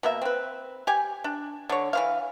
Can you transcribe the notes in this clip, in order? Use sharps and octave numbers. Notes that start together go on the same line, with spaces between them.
B2 A#3 E5
C4 B4
G4 G#5
D4
D3 C#5
E3 C5 F5